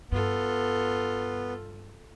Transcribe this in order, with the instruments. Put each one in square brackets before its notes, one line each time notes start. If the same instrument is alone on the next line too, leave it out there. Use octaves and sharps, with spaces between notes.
[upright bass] G2 [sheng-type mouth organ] B3 [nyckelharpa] F4 A4